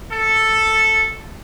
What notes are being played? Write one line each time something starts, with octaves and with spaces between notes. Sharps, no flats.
A4